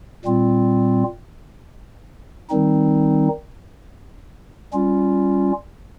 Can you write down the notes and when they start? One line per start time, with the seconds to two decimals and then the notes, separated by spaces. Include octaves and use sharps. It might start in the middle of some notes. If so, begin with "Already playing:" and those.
0.25 A#2 G3 C4 F4
2.50 D#3 G3 C4 D#4
4.73 G3 C#4 F4